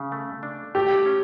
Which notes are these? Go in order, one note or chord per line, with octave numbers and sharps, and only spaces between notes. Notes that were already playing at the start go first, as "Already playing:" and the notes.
Already playing: C#3
A3
D4
A3 G4
C#4